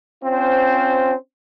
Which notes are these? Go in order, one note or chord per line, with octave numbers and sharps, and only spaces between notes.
C4 C#4 F4 C5